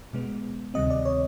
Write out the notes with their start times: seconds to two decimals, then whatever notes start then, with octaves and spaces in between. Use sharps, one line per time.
0.13 B2 G#3 B3
0.74 D2 C3 D#3 G3 C4 D#5
0.90 D5
1.05 C#5